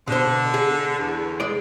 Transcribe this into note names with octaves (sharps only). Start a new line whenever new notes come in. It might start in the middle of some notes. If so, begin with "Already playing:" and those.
B2 D3 C5
G#4
E2
G#3 D5